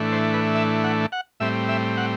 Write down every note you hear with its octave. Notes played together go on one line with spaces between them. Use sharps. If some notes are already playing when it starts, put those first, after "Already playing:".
Already playing: A2 E3 A3 D4
C5
B4
E5
F#5
F#5
A2 G3 C4 E5
E5
F#5